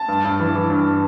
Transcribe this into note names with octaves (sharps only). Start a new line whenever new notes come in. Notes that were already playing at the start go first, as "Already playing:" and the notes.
Already playing: A5
G2
G2
E3
E3
G2